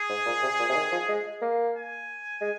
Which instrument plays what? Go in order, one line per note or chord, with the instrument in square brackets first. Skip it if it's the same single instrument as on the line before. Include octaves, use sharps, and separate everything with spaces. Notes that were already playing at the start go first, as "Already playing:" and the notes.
Already playing: [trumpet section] G#4
[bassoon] G#2
A#2
C3
A#2
C3
D#3
F3
G#3
A#3
[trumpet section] G#5
[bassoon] G#3